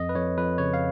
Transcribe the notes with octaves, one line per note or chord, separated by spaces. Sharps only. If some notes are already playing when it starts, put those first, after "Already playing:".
Already playing: F2 D#5
B4
F2 C#5
F2 B4
C#3 C#5
F5